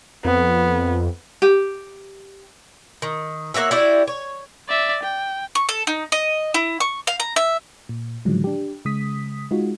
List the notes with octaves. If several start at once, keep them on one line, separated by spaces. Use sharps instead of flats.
F2 B3
G4
D#3
A#3 F#4 C#5 E5
E4 F#4 G4 D5
C#5
D5 E5
G5
C#6
A4
D#4
D#5
E4
C#6
F5
A#5
E5
A#2
A2 D3 D#3 F3 F#3 G#3
D4 G4
C#3 G#3 D#6 B6
G#3 D#4 F4 F#4